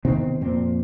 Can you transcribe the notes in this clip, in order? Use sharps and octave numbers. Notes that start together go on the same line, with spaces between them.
C3 D#3 B3 C4
F2 A#2 C4